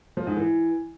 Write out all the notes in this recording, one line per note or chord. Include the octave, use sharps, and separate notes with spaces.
F3
G#2
E3